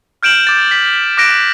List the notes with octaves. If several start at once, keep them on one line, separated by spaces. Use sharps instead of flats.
F6 G6 D7 E7 F#7
D6 A6 D7
B6
D6 F#6 A#6 D7 E7